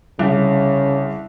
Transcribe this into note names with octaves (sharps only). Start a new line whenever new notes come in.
C2 C#3